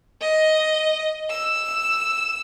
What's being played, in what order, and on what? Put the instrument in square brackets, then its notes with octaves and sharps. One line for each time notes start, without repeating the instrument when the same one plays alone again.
[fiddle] D#5
E6